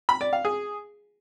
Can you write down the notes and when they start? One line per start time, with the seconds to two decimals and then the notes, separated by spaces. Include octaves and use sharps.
0.09 B5
0.21 D5
0.33 F5
0.45 G#4